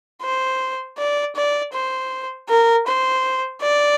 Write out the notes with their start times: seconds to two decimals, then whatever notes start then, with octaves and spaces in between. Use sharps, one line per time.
0.22 C5
0.98 D5
1.36 D5
1.73 C5
2.49 A#4
2.87 C5
3.62 D5